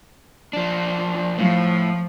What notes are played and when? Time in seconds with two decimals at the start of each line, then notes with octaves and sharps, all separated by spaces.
0.53 F3 D4
1.38 A2 F3